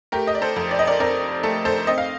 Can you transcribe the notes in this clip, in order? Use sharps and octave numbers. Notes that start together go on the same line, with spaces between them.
A3 G4 A#4
D#5
D5
A4 C5
F2
D5
D#5
A#4 D5
C4 A#4 D5
A3 A4
A4 C5
C4 D#5
F5